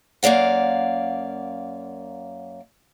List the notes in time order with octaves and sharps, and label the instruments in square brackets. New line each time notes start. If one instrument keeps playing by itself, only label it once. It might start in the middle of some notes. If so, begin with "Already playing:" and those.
[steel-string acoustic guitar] F#2 A#3 D5 F5 F#5